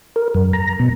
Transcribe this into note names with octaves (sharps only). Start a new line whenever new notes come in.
A#4
F#2
A#5
B2